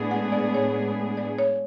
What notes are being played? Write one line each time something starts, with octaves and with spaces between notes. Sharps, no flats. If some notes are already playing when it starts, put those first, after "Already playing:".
Already playing: A2 G#3 B3 D4 G#4
F#5
D5
C#5
D5
C#5